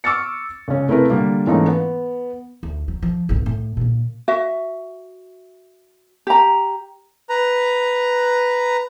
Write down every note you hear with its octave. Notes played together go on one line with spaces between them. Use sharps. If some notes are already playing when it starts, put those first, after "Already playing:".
C#6 D6 E6 F6 A6 C#7
C#2 C#4
C3 A3 E4 A#4 B4
D3 G3 A#3
G#2 E3 A3 A#3 C#4 D#4
B3
D2
F#3
F3
G1 C2
A2
A#2 D3
F#4 E5
G4 A#5
B4 A#5